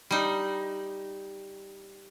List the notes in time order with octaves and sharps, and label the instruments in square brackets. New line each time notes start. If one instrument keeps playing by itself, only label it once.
[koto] G3 D#4